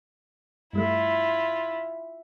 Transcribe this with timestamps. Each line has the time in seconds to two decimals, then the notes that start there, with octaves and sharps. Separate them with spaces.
0.73 G2 G3 A3 E4 F4